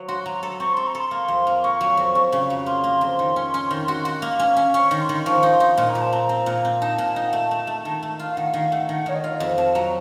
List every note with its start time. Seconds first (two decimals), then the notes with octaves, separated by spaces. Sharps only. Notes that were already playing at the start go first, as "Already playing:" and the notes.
Already playing: F#3
0.08 F#4 C6
0.25 F#3 A#5
0.42 A4 A#5
0.60 C4 C#6
0.73 A4 C6
0.87 A#5
0.95 A4
1.00 C6
1.11 A#3
1.28 F2
1.47 A#3
1.63 A#3 C#6
1.81 F#3
1.97 F2
2.15 F2
2.32 C#3
2.50 F#3
2.66 A#3 C6
2.84 A#3
3.01 F2
3.19 D#3
3.36 C#4
3.54 C#4
3.71 D#3
3.88 F#4
4.05 F#4
4.22 A#3
4.39 C#4
4.56 C#4
4.74 C#4 C#6
4.91 D#3
5.00 C6
5.09 D#3
5.26 F3 C#6
5.43 D#4
5.52 C6
5.60 D#4
5.78 A#2 C6
5.90 A#5
5.95 F3
6.01 A5
6.13 C4 A#5
6.29 C4
6.46 A#2
6.65 C4
6.81 D#4 A5
6.98 A#2
7.16 D#4
7.26 F#5
7.33 A3 A5
7.51 A3
7.67 A3
7.85 D#3
8.03 A3
8.19 F4
8.31 F5
8.37 D#3 F#5
8.54 D#3 F5
8.71 A3 F#5
8.88 D#3 F#5
9.06 D#3 C#5
9.15 D#5
9.24 F4
9.40 F2
9.58 F2 A5
9.75 F#3 A#5